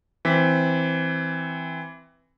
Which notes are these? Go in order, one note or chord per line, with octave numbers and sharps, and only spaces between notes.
E3 C4 B6